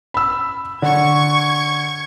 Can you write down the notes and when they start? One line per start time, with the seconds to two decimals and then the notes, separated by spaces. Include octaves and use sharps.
0.14 B5 E6
0.82 D3 C#6 G#6